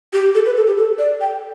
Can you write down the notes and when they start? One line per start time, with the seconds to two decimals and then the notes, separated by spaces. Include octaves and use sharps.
0.13 G4
0.35 A4
0.46 B4
0.57 A4
0.67 G4
0.78 A4
0.98 D5
1.21 G5